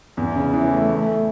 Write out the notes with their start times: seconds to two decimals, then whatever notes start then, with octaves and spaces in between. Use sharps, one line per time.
0.17 E2
0.35 C#3
0.53 E3
0.71 A3
0.89 A3
1.07 A3